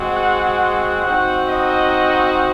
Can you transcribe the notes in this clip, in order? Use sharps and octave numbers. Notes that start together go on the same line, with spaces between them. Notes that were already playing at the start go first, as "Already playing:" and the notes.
Already playing: G#3 C4 F#4
F#5
F#5
C4 D#4 F#4
D#5